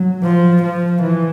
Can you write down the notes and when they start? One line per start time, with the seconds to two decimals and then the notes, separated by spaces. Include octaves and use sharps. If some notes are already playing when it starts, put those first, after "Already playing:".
Already playing: F#3
0.23 F3
0.63 F3
1.02 E3